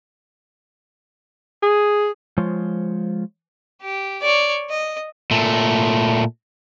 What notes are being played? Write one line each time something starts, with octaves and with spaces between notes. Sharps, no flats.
G#4
F3 G#3 F4 C5 C#5
G4
C#5 D5
D#5
A#2 A3